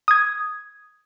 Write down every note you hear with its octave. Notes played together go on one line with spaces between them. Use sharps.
D#6 G#6